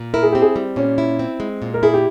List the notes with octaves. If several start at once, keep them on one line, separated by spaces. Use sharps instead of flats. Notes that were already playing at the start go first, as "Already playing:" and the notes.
Already playing: A#2
E4 A#4
G#4
C4 G4
G#4
G3
A#2 C#4
E4
C4
G#3
A#2
A#4
E4 G#4
G4